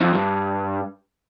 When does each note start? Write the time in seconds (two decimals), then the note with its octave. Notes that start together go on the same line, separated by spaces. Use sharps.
0.01 F2
0.15 G2